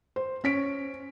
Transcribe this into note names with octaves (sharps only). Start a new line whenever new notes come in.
C5
C#4 B6 D7